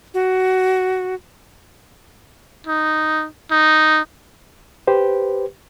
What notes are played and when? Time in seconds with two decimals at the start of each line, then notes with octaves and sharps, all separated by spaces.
0.14 F#4
2.67 D#4
3.51 D#4
4.87 G4 B4 C5